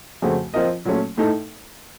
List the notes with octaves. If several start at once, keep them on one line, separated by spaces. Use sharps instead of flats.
F2 C#3 A3 C4 F#4
F3 C4 F4 A#4 D#5
A#2 F#3 A3 C#4
A2 A3 D#4 A4